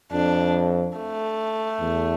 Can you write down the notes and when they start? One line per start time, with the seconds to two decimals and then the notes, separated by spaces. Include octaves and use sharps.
0.12 F2 D4
0.97 A3
1.81 E2